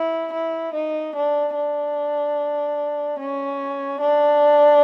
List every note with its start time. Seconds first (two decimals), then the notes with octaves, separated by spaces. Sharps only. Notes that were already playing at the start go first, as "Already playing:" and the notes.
Already playing: E4
0.33 E4
0.74 D#4
1.16 D4
1.55 D4
3.19 C#4
4.01 D4